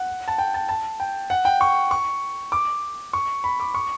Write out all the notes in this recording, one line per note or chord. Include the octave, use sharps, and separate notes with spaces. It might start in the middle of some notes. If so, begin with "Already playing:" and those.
Already playing: F#5
A5
G5
A5
A5
G5
F#5
G5
C#6
C#6
D6
C#6
B5
D6
C#6